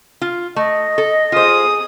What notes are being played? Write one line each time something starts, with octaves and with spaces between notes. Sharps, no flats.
F4
A3 D#5
A4
F4 G#4 C5 D#6